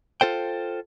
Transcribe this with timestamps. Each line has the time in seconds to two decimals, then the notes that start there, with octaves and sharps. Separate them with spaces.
0.21 F4 A4 C5 G5